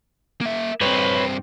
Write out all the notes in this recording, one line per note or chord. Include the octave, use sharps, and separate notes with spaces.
A#3 E5
G2 C4 B4 C#5